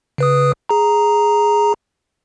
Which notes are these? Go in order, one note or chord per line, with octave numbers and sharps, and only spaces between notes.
C#3 B4 D#6
G#4 A#5